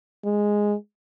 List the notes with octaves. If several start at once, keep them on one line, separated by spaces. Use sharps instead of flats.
G#3